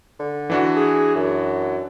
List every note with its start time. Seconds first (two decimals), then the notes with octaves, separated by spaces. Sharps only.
0.19 D3
0.50 E3 D4 F#4
0.76 G#4
1.15 F#2